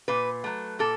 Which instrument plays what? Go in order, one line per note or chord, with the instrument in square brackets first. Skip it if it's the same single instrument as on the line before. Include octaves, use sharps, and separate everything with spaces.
[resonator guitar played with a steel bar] A#2 B4
F#3 A3
A#2 A4